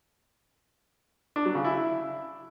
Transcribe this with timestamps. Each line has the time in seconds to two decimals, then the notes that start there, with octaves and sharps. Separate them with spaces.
1.36 D4
1.45 F#3
1.55 C#3
1.64 E4